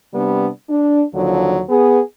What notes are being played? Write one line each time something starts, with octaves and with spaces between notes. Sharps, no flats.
C3 G3 B3 D4
D4
D#2 D3 F3 F#3
B3 G#4